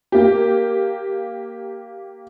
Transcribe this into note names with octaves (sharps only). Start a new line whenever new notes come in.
A#3 G4